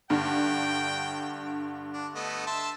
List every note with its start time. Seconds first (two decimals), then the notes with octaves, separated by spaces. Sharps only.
0.10 G2 D3 G5
1.93 D4
2.15 A3 B3 D#5
2.46 E5 A5 C6